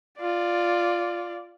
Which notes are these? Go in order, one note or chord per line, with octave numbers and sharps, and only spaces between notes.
F4 D5